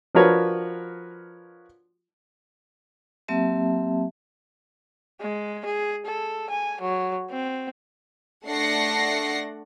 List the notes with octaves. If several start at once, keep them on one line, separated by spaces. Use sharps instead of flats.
F3 D4 F#4 A#4 B4 C#5
F#3 A#3 C4 G4 E5 A5
G#3
G#4
A4
G#5
F#3
C4
A3 D4 F#5 A#6 C7 C#7